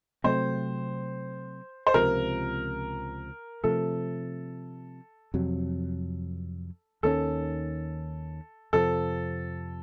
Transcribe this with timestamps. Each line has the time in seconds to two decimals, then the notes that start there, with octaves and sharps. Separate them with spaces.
0.24 C3 F#3 A3 C4 C5
1.87 C5
1.94 C#2 C3 F3 A#4
3.64 C3 F3 A3 A4
5.34 F2 C3 F#3
7.03 D#2 D#3 A#3 C#4 A4
8.73 F2 C3 F3 C4 A4